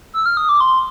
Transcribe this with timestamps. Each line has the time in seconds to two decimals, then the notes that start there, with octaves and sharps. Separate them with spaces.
0.14 E6
0.26 F6
0.37 D#6
0.49 D6
0.61 C6